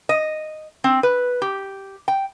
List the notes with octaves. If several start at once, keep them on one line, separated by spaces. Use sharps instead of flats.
D#5
C4
B4
G4
G5